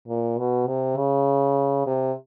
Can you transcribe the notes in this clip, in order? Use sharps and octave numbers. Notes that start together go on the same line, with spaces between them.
A#2
B2
C3
C#3
C3